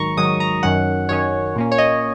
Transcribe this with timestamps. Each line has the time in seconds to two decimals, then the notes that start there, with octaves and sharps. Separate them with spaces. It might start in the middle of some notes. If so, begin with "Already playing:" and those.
Already playing: G#2 D#3 F#3 A#5 C#6
0.17 G#2 D#3 F#3 D#6
0.40 A#5
0.63 F#2 D#3 F#3 C#4 F#5
1.09 F#2 D#3 F#3 C#4 C#5
1.56 A#2 A#3 C#4
1.72 C#5
1.78 D#5